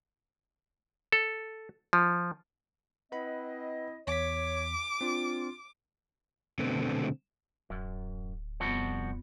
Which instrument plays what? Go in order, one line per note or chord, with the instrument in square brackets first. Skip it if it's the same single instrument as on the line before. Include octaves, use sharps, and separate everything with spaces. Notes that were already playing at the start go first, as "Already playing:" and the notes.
[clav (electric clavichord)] A4
F3
[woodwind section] C4 E4 D#5 [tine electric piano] B4 F#5 B5
[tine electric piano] E2 B6 [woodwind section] C#5 [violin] D6
[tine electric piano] C4 D4 [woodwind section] F4
[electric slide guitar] B2 D3 A3 B3 C4
[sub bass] D1 [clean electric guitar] F#2
[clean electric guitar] C2 F3 F#4 [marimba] F2 B3